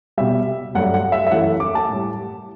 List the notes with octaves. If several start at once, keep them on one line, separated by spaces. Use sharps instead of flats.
B2 G3 E5
G2 F#3 A3 F#5
F#5
E5
E5
F#2 E3 A3 F#5
D6
A5
A2 G3